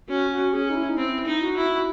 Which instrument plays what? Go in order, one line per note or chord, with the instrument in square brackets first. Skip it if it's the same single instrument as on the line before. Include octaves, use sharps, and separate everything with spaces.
[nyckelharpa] C#4 [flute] F#4
[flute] F#4
[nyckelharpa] C#4 [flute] G#4
[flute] D#4
E4
D#4
[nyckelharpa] C4 [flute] E4
[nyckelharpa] D#4
[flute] F#4
[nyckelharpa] E4